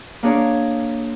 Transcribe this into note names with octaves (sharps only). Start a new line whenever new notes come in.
A#3 D4 G#4 C#5